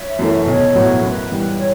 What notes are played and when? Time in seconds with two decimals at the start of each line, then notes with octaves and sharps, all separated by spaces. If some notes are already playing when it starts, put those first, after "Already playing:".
Already playing: C#5 E5
0.19 F#2 E3 A3 C#4
0.47 B1 A4 C#5
0.75 A2 F#3 B3 E4
1.02 F#2 B4
1.30 E3 G3
1.58 A4 C#5